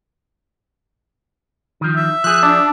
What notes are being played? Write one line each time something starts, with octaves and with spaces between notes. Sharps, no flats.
D#3 F3
E5
F3 G#4 F#6
D4